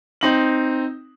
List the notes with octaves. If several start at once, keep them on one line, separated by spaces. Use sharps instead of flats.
C4 D#4 F#7